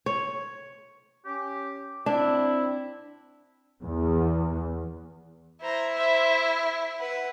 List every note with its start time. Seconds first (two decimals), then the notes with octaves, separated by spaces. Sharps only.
0.06 C#5
1.25 C#4 G4
2.06 C4 D4 E4
3.82 E2
5.61 E4 C5 A#5
5.96 C5 E5
7.00 B4 F#5